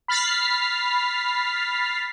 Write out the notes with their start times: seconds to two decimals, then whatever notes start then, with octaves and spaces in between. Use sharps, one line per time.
0.08 B5 F6 A6 B6 C7